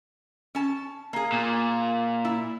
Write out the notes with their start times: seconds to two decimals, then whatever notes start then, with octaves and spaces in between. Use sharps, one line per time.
0.55 C#4 A5
1.13 A#3 G#4
1.32 A#2
2.25 E4